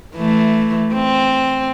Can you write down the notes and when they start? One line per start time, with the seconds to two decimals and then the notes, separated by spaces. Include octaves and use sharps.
0.16 E3 A3
0.94 C4